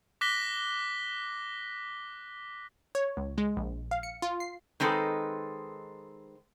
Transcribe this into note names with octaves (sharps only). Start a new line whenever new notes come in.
D6 F#6 A#6 B6 G7
C#5
C#2
G#3
A#1
F5
C#7
F4
C7
D#3 G#3 C4 A4 B4